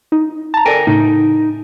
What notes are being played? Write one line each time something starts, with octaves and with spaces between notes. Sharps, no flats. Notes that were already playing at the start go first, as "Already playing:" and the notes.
D#4
A5 A#5
A4 A#4 D5 G5 G#5
A2 C#3 D#4